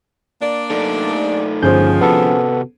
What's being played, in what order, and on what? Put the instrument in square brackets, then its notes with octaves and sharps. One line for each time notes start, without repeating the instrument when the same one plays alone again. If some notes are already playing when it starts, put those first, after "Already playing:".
[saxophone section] A#3 D4 D5
[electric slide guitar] A3 D#4 A4
[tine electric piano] G1 G6 [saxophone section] D3 D#3 F3 [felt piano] C#4 G#4 C5
[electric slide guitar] C3 F#4 [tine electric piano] B3 A4